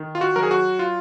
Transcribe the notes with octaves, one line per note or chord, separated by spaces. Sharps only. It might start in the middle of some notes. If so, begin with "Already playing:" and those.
Already playing: D#3
F4
F#4
F#3 A#4
G#4
F#4
F4